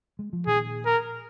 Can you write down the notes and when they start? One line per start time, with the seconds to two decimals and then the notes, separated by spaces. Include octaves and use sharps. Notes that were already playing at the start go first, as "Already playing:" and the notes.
0.19 G#3
0.33 F3
0.47 A#2 D#3 G#4
0.86 A#4